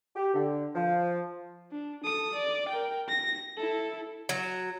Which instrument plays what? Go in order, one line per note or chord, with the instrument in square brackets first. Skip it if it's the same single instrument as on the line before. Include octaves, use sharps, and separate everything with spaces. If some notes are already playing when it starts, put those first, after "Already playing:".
[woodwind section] G4
D3
F3
[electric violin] D4
A4 D#6
D5
A#4 G5
A#6
E4 A4
[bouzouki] F#3